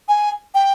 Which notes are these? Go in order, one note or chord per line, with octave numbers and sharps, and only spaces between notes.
G#5
G5